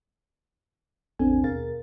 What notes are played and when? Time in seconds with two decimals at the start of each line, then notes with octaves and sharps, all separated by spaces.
1.19 A1 E2 C4 D4 A4 G#5
1.43 D#2 B2 G#4 A#4 F5 A6